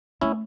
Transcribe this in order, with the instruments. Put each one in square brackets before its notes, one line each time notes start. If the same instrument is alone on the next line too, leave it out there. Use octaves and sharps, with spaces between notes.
[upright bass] A3 [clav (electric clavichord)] C#4 E4